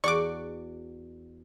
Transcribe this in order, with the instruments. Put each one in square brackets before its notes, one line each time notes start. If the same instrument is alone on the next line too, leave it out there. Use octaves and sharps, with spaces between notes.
[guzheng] E2 F#4 F#5 [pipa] D5 [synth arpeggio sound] C#6 D6